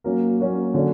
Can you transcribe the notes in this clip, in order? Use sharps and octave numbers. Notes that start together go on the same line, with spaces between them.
F#3 A#3 C#4 F#4 A#4
F#3 A#3 C#4 F#4 A#4
D3 F#3 C#4